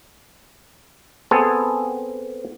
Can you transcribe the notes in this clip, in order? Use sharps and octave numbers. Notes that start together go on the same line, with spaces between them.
B3 C4 G#4 A4